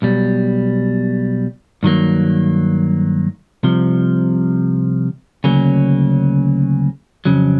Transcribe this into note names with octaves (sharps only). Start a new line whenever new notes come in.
B1 B2 G3
G2 D#3 F#3 A#3
C2 C3 F3
D2 C#3 F#3 A#3 C#4
F2 C#3 F#3